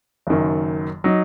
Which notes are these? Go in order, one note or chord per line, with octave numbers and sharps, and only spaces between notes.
F#1 F#2 D#3
F#3 D#4